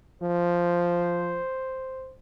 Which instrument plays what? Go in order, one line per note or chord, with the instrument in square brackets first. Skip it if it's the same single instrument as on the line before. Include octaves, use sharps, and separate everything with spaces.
[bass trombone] F3 [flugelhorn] C5